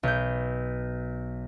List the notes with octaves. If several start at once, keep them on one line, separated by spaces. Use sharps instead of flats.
B1 G6